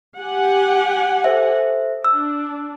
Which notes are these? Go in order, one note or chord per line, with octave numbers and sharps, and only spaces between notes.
G4 F#5 G#5
A4 C5 E5
D4 E6